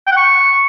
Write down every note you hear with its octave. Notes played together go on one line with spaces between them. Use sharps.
G5
F#5
C#6